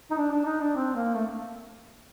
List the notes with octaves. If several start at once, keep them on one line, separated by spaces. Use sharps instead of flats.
D#4
D4
D4
D#4
D4
C4
A#3
A3